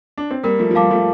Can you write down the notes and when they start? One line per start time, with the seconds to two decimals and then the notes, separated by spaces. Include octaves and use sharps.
0.18 D4
0.31 C4
0.43 G3 A#3 A#4
0.59 F3 A3
0.71 F3
0.75 G3 F5 A5 D6
0.90 F3 A3